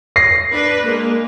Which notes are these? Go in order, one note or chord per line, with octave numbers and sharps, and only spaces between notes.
A#6 C7
D4 B4
G#3 A#3 A#4